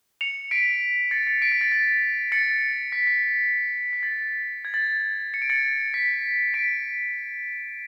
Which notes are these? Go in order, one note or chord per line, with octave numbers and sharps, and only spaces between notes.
C#7 F7
B6 D7
A6 C#7
A6 C#7
B6 D7
B6
A6
A6
A6 C#7
B6
B6
B6
A6
G#6
A6
C#7
D7
A6 C#7
B6
B6 D7